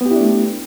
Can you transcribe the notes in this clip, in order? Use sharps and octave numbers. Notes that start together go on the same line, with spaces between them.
A3 B3 D4 E4 G4